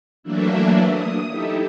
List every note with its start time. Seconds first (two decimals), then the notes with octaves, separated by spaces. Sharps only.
0.23 E3 F#3 A3 A#3 D4 E4
0.90 D#6
1.30 D#4 E4 G4 A4 E5